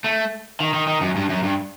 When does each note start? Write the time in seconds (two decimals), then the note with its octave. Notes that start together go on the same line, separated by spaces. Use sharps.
0.04 A3
0.60 D#3
0.74 D#3
0.87 D#3
1.01 F#2
1.16 G2
1.30 F#2
1.43 G2